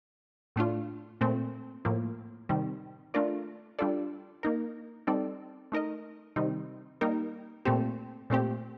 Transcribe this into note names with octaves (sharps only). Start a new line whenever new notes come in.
A2 A3 D4 F4
A#2 A3 C4
A2 F3 A#3
C3 D#3 G3
A3 D4 F4 A#4 D5
G3 D4 F4 A4 D5
A#3 D#4 A#4
G3 C4 D#4 A4 D5
A3 D#4 A#4 D#5
C3 D#3 G3 C4 D#4
G3 A#3 D#4 A#4
A#2 A3 C4 G4
A#2 A3 C4 G4